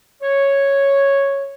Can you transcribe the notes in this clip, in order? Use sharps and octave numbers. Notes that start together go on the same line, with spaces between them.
C#5